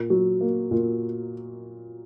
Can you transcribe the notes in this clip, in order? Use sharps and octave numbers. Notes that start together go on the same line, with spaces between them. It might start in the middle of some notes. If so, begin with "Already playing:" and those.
Already playing: A#2
F#3
A#3
A#2